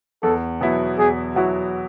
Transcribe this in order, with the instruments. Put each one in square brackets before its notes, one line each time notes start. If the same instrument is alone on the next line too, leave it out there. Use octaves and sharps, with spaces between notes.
[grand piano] E2 [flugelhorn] A4
[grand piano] B2 F#3 B3 E4
[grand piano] E2 [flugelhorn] G#4
[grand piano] B2 F#3 B3 E4 [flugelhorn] F#4